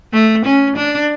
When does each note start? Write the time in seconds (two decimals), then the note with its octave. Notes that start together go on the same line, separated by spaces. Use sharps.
0.13 A3
0.45 C#4
0.77 D4